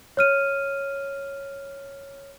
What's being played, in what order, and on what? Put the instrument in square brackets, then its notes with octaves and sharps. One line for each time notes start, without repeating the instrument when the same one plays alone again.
[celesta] C#5 F6 D#7